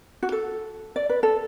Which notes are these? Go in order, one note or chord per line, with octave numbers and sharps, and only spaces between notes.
F#4
A4
D5
B4
A4